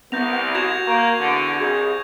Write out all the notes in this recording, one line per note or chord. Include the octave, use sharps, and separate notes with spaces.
C2 B3 G6 A#6 F7
F#4 G#6 E7 F7
A#3 C#6 G6
E2 D3
C2 G#4 G#6